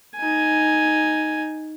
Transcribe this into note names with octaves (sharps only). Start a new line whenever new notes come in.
D#4 G#5